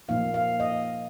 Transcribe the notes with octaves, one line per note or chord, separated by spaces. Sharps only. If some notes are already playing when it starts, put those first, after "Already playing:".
A#2 F3 A#3 D#4 F5
F5
D#5